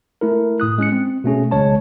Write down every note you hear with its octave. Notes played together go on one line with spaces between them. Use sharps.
A3 E4 A#4
A2 D#6 F#6
G#3 C#4 F#6 C#7
C4
B2 A3 C#4 G#4
B1 C#3 G#3 C#5 A5